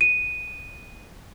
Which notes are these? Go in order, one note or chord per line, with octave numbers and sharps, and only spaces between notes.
D#7